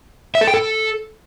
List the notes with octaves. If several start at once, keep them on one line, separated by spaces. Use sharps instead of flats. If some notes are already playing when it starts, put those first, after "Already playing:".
E5
A4
G5
A4